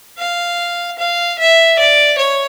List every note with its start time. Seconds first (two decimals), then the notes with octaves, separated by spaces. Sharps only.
0.18 F5
0.98 F5
1.39 E5
1.78 D5
2.18 C#5